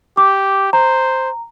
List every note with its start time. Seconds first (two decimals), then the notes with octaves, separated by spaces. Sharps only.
0.17 G4 D6
0.73 C5 A#5